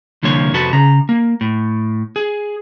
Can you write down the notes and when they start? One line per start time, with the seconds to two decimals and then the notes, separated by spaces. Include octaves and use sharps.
0.23 C2 D3 F3 A#3 C#5
0.53 F2 C3 F#4 A4 B4
0.73 C#3 A#5
1.09 A#3
1.41 A2
2.16 G#4